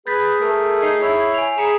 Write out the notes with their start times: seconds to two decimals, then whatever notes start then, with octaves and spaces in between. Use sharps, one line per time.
0.07 G#4 B4 G6 A6 B6
0.41 A3 A#4
0.82 D#4 C7
1.02 E4 C#5
1.34 G#5 F7
1.58 G#4 E5 A#5 B5 C#7